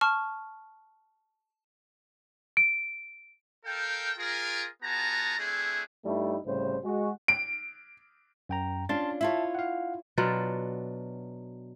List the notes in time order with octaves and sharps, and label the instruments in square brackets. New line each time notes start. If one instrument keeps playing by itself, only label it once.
[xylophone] A5 C#6 F6
[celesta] D7
[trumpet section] A4 A#4 F5 G5
F4 G#4 A#4
B3 F4 F#4 G#4 A5 A#5
A3 C4 D4 E4 G#4
[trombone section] G2 G3 A3 D#4 E4
C2 A2 C#3 G3 C5
G#3 F#4
[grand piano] D7
[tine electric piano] F#2 G5 A#5
[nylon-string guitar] C#4 D4 F4 [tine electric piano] A5 C6 A6
[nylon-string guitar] E4 F4 C#5 [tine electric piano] E5 A5
[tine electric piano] F5 F#5
[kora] B2 F#3 D4 F4